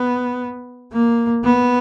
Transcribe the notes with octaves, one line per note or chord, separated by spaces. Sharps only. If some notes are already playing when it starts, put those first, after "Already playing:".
Already playing: B3
A#3
B3